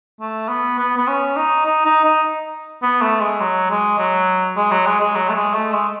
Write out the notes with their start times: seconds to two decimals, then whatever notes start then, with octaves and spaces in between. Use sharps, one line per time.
0.20 A3
0.49 B3
0.79 B3
0.98 B3
1.08 C#4
1.36 D#4
1.66 D#4
1.85 D#4
2.05 D#4
2.82 B3
3.02 A3
3.21 G#3
3.40 F#3
3.70 G#3
3.98 F#3
4.57 G#3
4.72 F#3
4.86 G#3
5.00 G#3
5.15 F#3
5.29 A3
5.35 G#3
5.54 A3
5.73 G#3